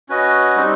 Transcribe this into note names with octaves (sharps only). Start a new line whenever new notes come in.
C#4 F#4 B4 D#5
G3 C4 D#4